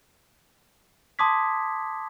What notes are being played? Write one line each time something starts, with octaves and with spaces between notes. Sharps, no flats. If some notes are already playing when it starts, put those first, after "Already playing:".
A5 C6 D6 D#6 G#6 B6